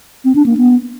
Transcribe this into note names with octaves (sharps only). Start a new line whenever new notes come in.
C4
D4
A#3
B3